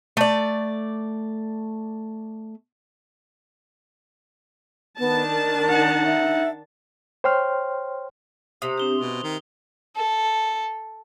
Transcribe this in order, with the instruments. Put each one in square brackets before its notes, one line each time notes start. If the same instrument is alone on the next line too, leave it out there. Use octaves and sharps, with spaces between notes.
[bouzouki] A3 D5
[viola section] D#3 D4 A5 [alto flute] B3
[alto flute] A#4
[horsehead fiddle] D#4 F#5
[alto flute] E5
[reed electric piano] C5 C#5 G5 C6 F6
[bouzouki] C3 [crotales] D#6 F7
[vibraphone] C4 D4 G4 [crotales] D#6 G7
[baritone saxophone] B2 [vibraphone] C6
[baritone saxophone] D#3
[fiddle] A4